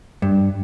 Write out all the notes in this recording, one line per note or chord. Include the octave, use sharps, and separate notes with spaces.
G2